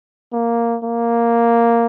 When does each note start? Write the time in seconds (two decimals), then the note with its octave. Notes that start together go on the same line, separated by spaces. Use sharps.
0.33 A#3
0.84 A#3